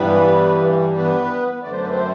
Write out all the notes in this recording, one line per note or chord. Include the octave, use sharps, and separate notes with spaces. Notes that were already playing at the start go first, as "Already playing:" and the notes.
Already playing: G2 E3 G3 B3 B4
B3 B4
F#2 D3 A3 D5
C5
B4
C4 C5